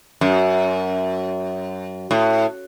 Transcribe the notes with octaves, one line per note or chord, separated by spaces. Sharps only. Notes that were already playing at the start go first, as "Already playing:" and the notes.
F#2
A2